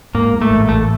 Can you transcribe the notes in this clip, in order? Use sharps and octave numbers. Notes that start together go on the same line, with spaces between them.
G#2 A#3
G#2
A3
A1
A1 A3